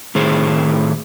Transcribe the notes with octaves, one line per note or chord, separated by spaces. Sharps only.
A2 D#3 G#4 C5